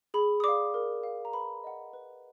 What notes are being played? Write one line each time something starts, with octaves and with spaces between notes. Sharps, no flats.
G#4 B5
D#6
D5 F5 D6
A#4
F5
A#5
B4 B5
D#5 F#5
B4